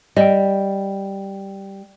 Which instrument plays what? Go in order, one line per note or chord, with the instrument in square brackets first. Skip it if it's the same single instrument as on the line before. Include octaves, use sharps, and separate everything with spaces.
[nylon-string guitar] G3 [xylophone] D#5 G5